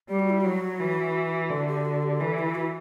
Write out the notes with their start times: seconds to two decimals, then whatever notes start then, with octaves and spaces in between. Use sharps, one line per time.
0.09 G3 G4
0.19 F#4
0.30 E4
0.41 F#3 F#4
0.80 E3
1.50 D3 F#4
1.67 G4
1.85 F#4
2.03 G4
2.20 E3 A4
2.38 E4
2.55 F#4